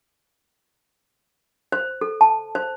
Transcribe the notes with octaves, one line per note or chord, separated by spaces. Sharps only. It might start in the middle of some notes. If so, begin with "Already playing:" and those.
C5
A4
A5
C5